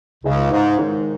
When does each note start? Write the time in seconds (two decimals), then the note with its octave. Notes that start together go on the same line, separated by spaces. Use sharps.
0.24 C#2 C#3 G#3 D#4 G#4 B4 D#5
0.51 G#2
0.78 D#3 G#3 D#4 A#4 C#5